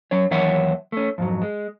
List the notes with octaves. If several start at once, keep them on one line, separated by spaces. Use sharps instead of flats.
F#3 C#4 C#5
D#2 E3 F#3 C#5 E5 F#5
A3 C#4
F2 G#2 F#3
G#3